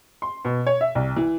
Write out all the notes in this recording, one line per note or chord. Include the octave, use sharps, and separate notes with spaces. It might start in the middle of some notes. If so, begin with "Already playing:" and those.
C6
B2
C#5
E5
C2
E3